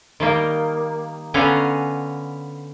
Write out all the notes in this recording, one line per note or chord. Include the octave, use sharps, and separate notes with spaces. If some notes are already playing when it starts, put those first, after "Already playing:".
D#3 G3 A#3
D3 B3 C#4 F5 G#5 A#5